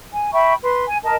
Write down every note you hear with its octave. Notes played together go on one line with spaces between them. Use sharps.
G#5
E5 G5 B5 C#6
B4 C6
G#5
A#4 D#5 A5